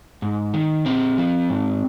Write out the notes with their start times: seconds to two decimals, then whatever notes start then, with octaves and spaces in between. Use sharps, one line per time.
0.22 G#2
0.54 D#3
0.85 A#2 C4
1.18 F3
1.50 G#2